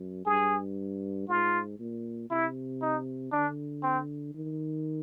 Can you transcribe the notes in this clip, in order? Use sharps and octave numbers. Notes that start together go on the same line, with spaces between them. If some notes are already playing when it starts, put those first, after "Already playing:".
Already playing: F#2
G2 G#4
G#2 F4
A#2
C3 E4
D#4
D3 D4
C4
D#3